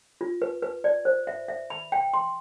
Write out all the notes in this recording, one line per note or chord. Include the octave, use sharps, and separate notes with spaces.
F4
B4
B4
D5
C5
E5
E5
B5
G5
C6